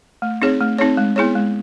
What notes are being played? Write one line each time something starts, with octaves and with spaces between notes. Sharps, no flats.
A3
C4 D#4 G#4 C#5
A3
C4 D#4 G#4 C#5
G#3
B3 E4 G#4 C#5
G#3